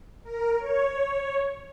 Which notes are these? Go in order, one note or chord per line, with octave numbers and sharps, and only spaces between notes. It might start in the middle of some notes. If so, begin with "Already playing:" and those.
A#4
C#5